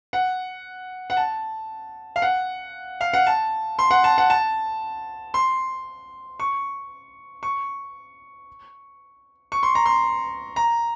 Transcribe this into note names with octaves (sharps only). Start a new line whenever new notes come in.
F#5
F#5
A5
F5
F#5
F5
F#5
A5
C6
F#5
A5
F#5
A5
C6
C#6
C#6
C#6
C6
A#5
C6
A#5